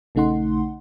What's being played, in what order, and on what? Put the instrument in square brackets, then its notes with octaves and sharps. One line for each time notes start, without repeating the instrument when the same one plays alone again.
[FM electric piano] A#1 C#3 A3 D#4 F#5 C6